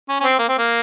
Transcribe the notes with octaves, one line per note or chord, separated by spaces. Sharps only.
C#4
C#4
C4
A#3
C4
A#3